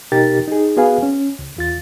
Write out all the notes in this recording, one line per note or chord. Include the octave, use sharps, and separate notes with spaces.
B2 D#4 G4 A#4 A6
D#4 G#4
B3 F#4 G#4 B4 F5 G#5
C#4
C#2
E2 F4 A6